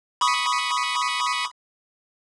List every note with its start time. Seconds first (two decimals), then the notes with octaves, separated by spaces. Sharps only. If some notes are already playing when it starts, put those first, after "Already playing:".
0.21 B5 C#6 D#6